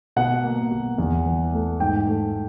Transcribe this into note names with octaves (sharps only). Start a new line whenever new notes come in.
B2 F#5
A#3
B2
E2
E3
A3
G#2 G5
A3